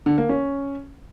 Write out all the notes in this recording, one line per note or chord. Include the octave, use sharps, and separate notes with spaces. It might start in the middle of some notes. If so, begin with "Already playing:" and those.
D3
A#3
C#4